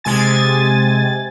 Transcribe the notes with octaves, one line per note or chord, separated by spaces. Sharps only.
C3 G#3 G#5 A6